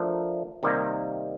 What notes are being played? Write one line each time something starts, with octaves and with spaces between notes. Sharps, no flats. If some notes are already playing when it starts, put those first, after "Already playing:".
Already playing: F3 A3 D4 A#4
C3 D#3 G3 A#3